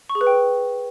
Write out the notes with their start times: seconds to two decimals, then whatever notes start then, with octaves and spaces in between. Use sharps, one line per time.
0.09 C#6
0.15 G#4
0.21 B4
0.27 G5